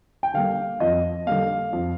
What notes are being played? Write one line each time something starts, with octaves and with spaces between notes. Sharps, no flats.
G5
D3 G3 A#3 F5
F2 D#5
D3 G3 A#3 F5
F2